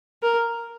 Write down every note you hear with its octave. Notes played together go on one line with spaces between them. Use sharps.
A#4